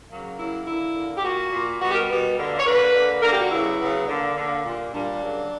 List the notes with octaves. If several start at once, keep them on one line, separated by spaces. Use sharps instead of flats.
C#3 F#3 A#3
C#3 F#3 A#3 E4
D3 A#3 E4
D3 A#3
G4
A#2 A#3 F#4
A#2 A#3
B2 G3 B3 F#4
G4
A#4
B2 G3 B3
D3 A#3
C#5
D3 A#3 B4
D3 A#3
D3 A#3 A#4
G4
F#4
C#3 F#3 B3 E4
C#3 F#3 B3
D3 A#3
D3 A#3
A#2 G3 A#3
A#2 G3 A#3 D4
C#3 F#3 A#3